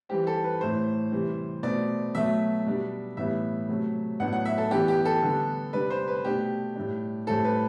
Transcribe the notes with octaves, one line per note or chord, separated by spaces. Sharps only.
E3 G3 C4 G4
A4
B4
A2 E3 A3 C4 C5
C3 E3 G3
B2 A3 C4 D5
B2 F#3 A3 E5
B2 G3 D4
A2 E3 G3 B3 E5
C3 F#3 A3
A2 F#3 B3 D4 F#5
F#5
E5
A4
E3 B3 D4 G4
G4
A4
D3 G3 B3
C3 G3 D4 B4
C5
B4
B2 A3 D4 G4
A2 G3 D4
A2 G3 C4 A4
B4